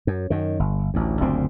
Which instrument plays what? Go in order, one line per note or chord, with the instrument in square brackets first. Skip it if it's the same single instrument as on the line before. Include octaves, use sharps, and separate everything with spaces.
[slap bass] F#2
F#2 D#3
G1
A1 D2
F#1 D2 A#2 C4